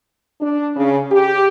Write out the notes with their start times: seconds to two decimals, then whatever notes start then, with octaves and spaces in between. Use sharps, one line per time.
0.41 D4
0.75 C#3
1.12 G4